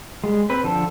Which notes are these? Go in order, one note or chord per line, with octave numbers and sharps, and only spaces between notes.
G3 G#3
C4 B4
D3 F3 A4